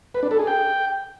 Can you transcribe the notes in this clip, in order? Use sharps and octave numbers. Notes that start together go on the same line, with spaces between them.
B4
D4
A4
G#4
G5